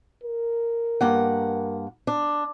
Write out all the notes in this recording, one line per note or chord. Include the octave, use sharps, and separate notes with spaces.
A#4
G2 A#3 F#5
D4